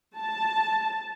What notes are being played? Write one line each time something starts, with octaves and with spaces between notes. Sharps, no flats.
A5